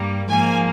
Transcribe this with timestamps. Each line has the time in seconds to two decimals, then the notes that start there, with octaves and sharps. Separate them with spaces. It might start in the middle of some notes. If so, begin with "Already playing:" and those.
Already playing: G2 G3 A#3
0.27 G#2 F3 A#3 G#5